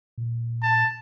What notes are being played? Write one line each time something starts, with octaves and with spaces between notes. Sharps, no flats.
A#2
A5